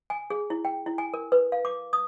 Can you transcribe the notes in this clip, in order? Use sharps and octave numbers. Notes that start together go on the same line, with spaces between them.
G#5
G#4
E4
G5
E4
G#5
A#4
B4
F5
D6
D#6